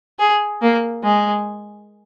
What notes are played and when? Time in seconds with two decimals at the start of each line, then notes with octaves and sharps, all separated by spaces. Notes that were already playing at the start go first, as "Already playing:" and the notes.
0.19 G#4
0.62 A#3
1.04 G#3